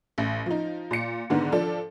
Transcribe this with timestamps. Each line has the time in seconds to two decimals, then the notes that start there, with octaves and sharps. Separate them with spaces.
0.18 A1
0.46 F3 D#4
0.91 A#2 C#7
1.30 G#2 D3 D#3 B3
1.52 F3 D4 A4